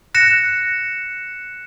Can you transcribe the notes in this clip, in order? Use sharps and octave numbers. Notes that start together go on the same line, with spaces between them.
F#6 A#6 C#7 E7